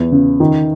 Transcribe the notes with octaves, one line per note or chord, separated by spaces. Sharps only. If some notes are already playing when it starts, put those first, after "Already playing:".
Already playing: E2
C#3
D#3